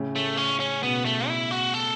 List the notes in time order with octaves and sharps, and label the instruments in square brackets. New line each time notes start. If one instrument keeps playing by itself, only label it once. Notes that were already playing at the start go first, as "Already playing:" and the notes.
Already playing: [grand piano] A2 C#3
[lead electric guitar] A3
C#4
C#4
[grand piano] B2 [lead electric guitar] B3
[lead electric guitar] A3
E4
F#4
A4